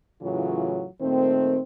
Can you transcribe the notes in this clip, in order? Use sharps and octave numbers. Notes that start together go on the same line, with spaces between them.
A2 C#3 E3 F#3 F4
A#2 D#3 A3 C4